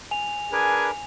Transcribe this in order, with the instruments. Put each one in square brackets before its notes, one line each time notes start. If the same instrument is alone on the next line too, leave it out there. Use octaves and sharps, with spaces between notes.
[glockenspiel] G#5 F7
[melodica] D4 A#4 B4 [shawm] G#4